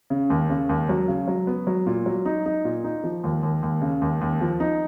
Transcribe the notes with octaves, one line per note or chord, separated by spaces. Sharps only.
C#3
D#2
C#3
D#2
F#3
C#3
F#3
B3
F#3
A#2
F#3
D#4
D#4
A#2
D#4
F3
D#2
D#2
D#2
C#3
D#2
D#2
F3
D#4